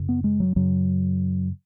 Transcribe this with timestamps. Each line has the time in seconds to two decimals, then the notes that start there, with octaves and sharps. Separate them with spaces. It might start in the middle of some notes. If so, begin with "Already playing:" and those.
Already playing: F#2 C#3
0.09 B3
0.24 G#3
0.40 F#3
0.56 F#2 C#3 F#3